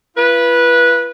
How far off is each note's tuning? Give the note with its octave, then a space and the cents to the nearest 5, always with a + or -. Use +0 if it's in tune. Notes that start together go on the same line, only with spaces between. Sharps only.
F4 -45 B4 -15